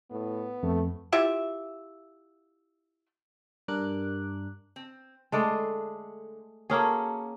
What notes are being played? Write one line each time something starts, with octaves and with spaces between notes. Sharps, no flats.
A2 B3
F2 A3
E4 F4 G4 E5
G2 G3 D4 A#4 D6 F#6
C4
D3 G#3 A3 G#4 A4 D5
A#3 C#4 F#4 G#4 A4